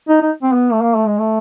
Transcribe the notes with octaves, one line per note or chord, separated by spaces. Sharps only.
D#4
D#4
C4
B3
A3
A#3
A3
G#3
A3